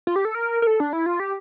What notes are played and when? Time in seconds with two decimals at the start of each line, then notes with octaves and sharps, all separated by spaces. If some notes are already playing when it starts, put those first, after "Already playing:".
0.07 F4
0.16 G4
0.25 A4
0.35 A#4
0.62 A#4
0.67 A4
0.80 D4
0.93 E4
1.06 F4
1.20 G4